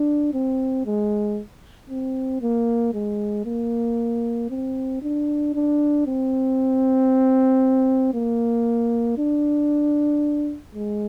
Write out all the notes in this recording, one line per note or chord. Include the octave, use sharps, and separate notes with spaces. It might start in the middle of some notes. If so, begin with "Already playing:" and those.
Already playing: D4
C4
G#3
C4
A#3
G#3
A#3
C4
D4
D4
C4
A#3
D4
G#3